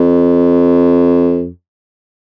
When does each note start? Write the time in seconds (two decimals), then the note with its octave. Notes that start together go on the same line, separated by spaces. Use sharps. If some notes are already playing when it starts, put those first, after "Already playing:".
Already playing: F2